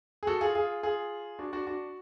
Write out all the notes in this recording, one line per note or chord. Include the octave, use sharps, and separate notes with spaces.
G#4
F#4 A4
F4 G#4
F4 G#4
F4 G#4
D4 F#4
D4 F#4
D4 F#4